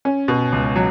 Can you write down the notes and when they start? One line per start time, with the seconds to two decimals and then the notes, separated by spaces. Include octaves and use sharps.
0.05 C#4
0.28 B2
0.52 C#2
0.76 F#3